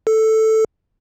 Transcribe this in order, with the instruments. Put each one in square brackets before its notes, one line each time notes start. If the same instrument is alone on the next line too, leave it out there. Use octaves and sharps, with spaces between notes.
[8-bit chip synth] A4